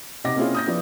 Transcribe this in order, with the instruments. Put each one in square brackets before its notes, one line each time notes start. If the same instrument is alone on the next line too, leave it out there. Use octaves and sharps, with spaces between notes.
[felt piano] C3 D#4 F#5 D6 A#6
A#3 C4 C#4 E4 F4 G#4
D#6 G6 A#6
F3 B3 E4 D5